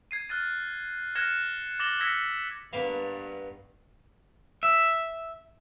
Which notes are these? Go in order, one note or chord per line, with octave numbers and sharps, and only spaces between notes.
G#6 C7 D#7
F6 F#6 A6 D#7
F6 F#6 G#6 A#6 C#7 E7
D6 A6 A#6 E7 F#7 G7
E6 F6 G#6 A#6 B6 C#7
G2 A#3 B3
E5